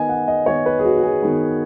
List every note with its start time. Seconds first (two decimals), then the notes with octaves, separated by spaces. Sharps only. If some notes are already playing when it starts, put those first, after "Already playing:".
Already playing: D#3 B3 D#5 G#5
0.09 F#5
0.28 D#5
0.46 D#3 B3 C#5
0.66 B4
0.79 G#4
0.85 F#4
0.97 F#4
1.03 G#4
1.23 D#3 B3